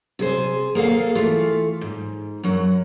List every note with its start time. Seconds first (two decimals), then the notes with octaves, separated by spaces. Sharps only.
0.19 C3 G#4 C5
0.75 A#3 G#4 A4 F5
1.15 E3 A3 F4
1.81 G#2
2.43 F#2 F#3